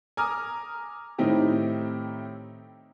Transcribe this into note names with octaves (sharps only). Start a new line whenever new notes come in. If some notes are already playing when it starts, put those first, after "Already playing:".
G#5 A#5 D6 D#6 F6
A2 D#3 C4 D#4 E4 G4